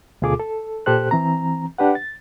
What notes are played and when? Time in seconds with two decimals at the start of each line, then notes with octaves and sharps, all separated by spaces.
0.22 D2 B2 F4 G#4 A4 D6
0.39 A4
0.86 A#2 G4 A4 C5 F#6
1.11 E3 C4 A#5
1.78 D4 G4 B4 F#5
1.95 A6